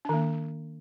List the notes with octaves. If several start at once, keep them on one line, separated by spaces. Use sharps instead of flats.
D#3 A#3 D4